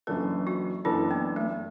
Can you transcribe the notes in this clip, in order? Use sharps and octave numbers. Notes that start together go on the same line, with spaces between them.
F#1 F#2 E3 D4 A4 B4
F#4
F#1 F#2 E3 D4 E4 A4
B3
A3